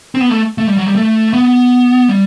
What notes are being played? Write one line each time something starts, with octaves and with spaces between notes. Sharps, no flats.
C4
B3
A3
A3
G3
F#3
G3
A3
B3
G3